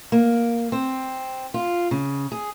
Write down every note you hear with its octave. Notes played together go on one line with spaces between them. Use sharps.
A#3
C4
F4
C#3
G#4